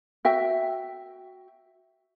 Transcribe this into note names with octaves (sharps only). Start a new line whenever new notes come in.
F#4 E5 G5